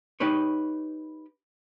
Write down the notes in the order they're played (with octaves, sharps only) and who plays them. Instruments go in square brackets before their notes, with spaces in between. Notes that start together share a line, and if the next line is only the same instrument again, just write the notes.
[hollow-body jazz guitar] D#4 G4 B4 C#5